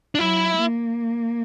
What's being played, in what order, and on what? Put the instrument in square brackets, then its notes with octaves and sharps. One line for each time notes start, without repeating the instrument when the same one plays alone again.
[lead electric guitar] D4
[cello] F#3 [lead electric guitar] E4
[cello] A#3